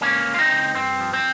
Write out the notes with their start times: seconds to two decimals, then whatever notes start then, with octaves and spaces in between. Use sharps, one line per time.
0.01 C#2 A#3 C#4
0.26 C#2
0.34 F4
0.39 C4 D#4
0.51 C#2
0.75 G2 C4
1.00 F3
1.13 C4